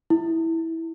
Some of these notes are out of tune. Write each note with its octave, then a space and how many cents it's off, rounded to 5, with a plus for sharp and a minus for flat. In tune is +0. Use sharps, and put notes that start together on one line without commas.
E4 -10